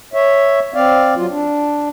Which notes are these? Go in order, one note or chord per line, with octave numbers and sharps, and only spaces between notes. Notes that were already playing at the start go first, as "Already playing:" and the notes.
C#5 E5
C4 D5 F5
F#3 F4
D4